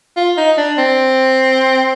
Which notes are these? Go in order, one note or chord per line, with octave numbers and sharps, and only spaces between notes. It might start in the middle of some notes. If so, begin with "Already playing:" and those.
F4
D#4
D4
C4